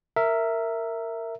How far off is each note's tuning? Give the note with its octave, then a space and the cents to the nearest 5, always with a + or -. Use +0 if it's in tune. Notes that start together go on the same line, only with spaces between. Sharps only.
A#4 -15 E5 +0